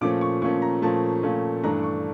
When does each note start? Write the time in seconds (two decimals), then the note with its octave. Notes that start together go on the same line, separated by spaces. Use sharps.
0.01 A#2 F3 A3 C#4 D6
0.21 C#6
0.42 A#2 F3 A3 C#4 C#6
0.62 A#5
0.82 A#2 F3 A3 C#4 A5
1.23 A#2 F3 A3 C#4
1.63 G2 E3 A3 D4 A#5
1.83 C#6